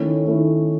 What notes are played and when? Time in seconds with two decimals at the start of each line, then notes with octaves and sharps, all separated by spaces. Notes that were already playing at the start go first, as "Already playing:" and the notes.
Already playing: D#3 A3 C#4 E4
0.26 D#3 A3 C#4 E4